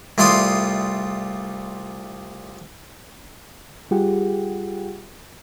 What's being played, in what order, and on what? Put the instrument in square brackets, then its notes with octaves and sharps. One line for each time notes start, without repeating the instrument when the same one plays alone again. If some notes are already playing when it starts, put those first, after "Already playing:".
[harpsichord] C2 A3 F4 D5 C6 D#6
[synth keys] G3 F4 G4 G#4 F#5 G5